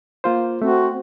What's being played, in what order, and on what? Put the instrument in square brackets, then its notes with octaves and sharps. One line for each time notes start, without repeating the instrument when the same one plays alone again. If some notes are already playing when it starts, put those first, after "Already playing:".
[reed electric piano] A#3 F4 C5
[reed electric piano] A3 [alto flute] C4 [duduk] F#4